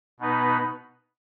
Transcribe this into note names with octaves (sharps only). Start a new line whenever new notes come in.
B2 B3 D#4 B4